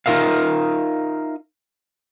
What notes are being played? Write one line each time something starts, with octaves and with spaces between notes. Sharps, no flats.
D#4 F4 A#4 E5 F5